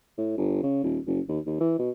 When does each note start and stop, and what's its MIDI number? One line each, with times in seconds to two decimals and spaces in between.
0.18 0.35 45
0.38 0.59 31
0.63 0.83 49
0.84 0.98 27
1.07 1.20 30
1.29 1.39 39
1.47 1.60 39
1.60 1.76 52
1.79 1.90 47